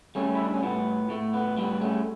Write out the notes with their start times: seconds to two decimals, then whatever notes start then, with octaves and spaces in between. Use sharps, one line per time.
0.15 G3 A3 C#4
0.35 E4
0.44 D4
0.54 C#4
0.63 A2 B3
1.09 A2 A3
1.33 B3
1.57 G3 B3
1.81 A3 C#4